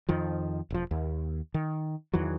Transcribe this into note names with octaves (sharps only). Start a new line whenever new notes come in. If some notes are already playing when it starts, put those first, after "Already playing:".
F2 D#3 F3
E1 F3
D#2
D#3
E2 D#3 E3 F#3